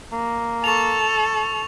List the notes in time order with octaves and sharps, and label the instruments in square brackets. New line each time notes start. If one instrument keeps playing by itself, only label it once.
[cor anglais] A#3
[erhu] A4 [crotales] C#6 F7